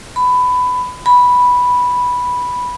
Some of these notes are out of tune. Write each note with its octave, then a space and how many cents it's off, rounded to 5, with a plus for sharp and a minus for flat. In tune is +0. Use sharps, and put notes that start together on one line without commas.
B5 +15
B5 -5